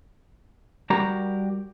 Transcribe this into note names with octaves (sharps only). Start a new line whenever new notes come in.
G3 F#4 G4 A#4 A#5